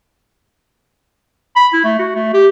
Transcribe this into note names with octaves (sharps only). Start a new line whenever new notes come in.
B5
E4
A3
F#4
A3
G4